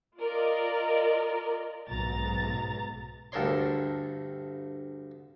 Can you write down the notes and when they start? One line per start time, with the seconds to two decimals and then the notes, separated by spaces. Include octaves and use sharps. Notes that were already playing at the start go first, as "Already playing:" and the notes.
0.18 F4 A#4 D5 D#5
1.90 B1 G#2 A#5 A6
3.32 D2 G2 A4 A#4 C#5 C6